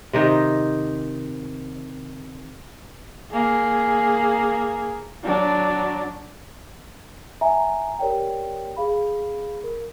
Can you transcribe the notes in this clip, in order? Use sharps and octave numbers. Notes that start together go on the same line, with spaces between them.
C3 D#3 D#4
A#3 G#4
F#3 D4
E5 G#5 A#5
G4 A#4 C#5 D5 G5
G#4 F5 B5
A#4